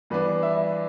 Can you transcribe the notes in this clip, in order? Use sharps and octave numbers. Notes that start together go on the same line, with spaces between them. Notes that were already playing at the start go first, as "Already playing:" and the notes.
G2 E3 B3 D4 B4
E5